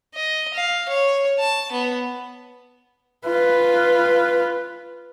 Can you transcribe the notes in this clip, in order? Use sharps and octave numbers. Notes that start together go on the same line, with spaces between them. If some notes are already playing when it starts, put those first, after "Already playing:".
D#5
F5
C#5
A5
B3
F4 B4